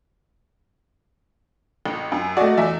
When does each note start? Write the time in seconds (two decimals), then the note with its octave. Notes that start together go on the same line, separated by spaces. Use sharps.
1.86 A1
2.12 F#2
2.37 A3 F#4 D5 D#5
2.58 E2 E5